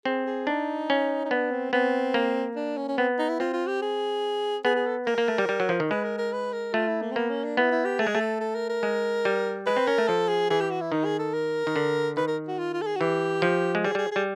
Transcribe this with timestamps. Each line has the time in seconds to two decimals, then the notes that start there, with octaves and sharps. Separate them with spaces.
0.05 C4 G#4
0.26 G#4
0.47 D4 D#4
0.90 C#4
1.26 D#4
1.31 B3 D4
1.51 C4
1.73 B3 C4
2.14 A#3
2.56 D4
2.77 C#4
2.88 C#4
2.97 B3 C4
3.19 D#4
3.29 E4
3.40 C4 F4
3.53 F4
3.67 G4
3.82 G#4
4.65 B3 G#4
4.76 G#4
4.86 A4
5.06 A#3 A#4
5.18 A#3
5.28 A3
5.38 G3
5.49 G3
5.60 F#3
5.69 F3
5.80 D#3
5.91 G#3 B4
6.04 A#4
6.18 A#4
6.33 B4
6.53 A#4
6.74 A3 F4
6.88 E4
7.02 A#3
7.12 C4
7.16 A#3 B3
7.30 C#4
7.44 D4
7.57 B3 E4
7.72 E4
7.85 G4
7.99 A3 G#4
8.07 G#3
8.15 A3
8.20 A4
8.41 A4
8.55 A#4
8.70 A#4
8.83 G#3
9.25 G3
9.67 G#3 B4
9.77 C4
9.87 C#4 A#4
9.98 A3
10.08 F3 A4
10.29 G#4
10.50 E3 G#4
10.61 G4
10.70 F#4
10.81 E4
10.92 D#3 D#4
11.05 G#4
11.19 A4
11.34 A#4
11.67 D#3
11.76 D3
12.17 D#3 B4
12.28 A#4
12.48 F#4
12.59 F4
12.73 F4
12.82 A4
12.87 G#4
12.96 F#4
13.00 E3 G4
13.42 F3
13.75 G#3
13.84 G3 G#4
13.95 G3 G#4
14.12 G3 G#4